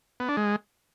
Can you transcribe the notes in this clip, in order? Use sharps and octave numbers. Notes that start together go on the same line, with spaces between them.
B3
D4
G#3